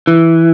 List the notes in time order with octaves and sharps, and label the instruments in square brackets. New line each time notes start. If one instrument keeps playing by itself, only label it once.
[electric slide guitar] E3